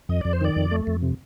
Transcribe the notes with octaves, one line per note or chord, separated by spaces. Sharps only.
F2 D#5
F2 D5
C5
D#3 D5
F2
A3
F2
C3